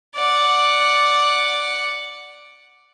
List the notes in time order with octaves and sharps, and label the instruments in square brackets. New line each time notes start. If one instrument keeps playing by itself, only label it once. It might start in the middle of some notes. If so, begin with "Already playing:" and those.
[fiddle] D5 F#5